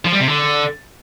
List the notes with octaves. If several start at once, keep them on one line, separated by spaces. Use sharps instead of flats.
F3
G3
C3
D3